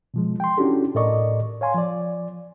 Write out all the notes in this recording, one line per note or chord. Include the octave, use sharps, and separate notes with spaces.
B2 F3 G#3
G5 C6
C#4 D4 E4 F#4 G4 A4
A2 A4 A#4 D5 D#5 C#6
C#5 F5 G#5 C6
F3 D5